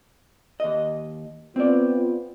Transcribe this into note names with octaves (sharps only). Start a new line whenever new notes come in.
D#2 D#5
B3 C4 F4 D5